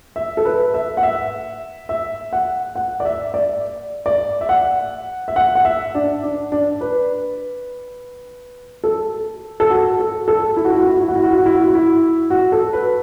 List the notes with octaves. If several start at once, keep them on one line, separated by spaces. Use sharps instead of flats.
E5
A4
B4
E5
F#5
E5
E5
F#5
F#5
D5
E5
D5
D5
E5
F#5
E5
F#5
F#5
E5
D4
D4
D4
B4
A4
A4
F#4
A4
A4
E4
F#4
E4
F#4
E4
F#4
E4
F#4
E4
F#4
E4
F#4
E4
F#4
E4
F#4
E4
F#4
A4
B4